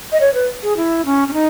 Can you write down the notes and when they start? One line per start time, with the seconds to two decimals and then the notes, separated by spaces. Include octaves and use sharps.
0.12 D#5
0.21 C#5
0.34 B4
0.63 G#4
0.77 E4
1.05 C#4
1.28 C#4
1.33 D#4